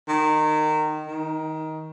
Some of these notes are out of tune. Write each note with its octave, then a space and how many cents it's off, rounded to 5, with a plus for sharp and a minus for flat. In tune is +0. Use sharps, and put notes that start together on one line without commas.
D#3 -20
D#3 +15